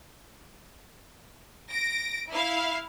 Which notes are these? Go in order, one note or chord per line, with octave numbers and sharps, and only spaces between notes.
A#6 D7
E4 F5